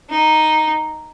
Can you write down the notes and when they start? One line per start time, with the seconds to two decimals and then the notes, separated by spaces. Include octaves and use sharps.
0.10 D#4